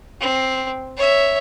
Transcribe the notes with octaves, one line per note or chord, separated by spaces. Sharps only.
C4
C#5 E5